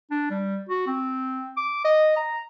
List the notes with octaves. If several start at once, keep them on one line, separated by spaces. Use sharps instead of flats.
D4
G3
F#4
C4
D6
D#5
A#5